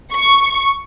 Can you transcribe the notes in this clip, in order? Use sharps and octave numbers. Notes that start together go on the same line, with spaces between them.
C#6